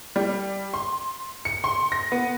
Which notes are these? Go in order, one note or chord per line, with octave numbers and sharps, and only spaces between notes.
G3
C6
C#7
C6
A#6
B3